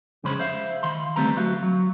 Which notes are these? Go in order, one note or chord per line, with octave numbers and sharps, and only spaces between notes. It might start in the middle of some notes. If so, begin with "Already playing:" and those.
F2 C#3 G#3 C#4 C5 B5
C5 E5 F5
D#3 F5 B5 C6
D3 G3 A3 C4 B4 A#5
D2 F#3 A3 F#4 F5
F#3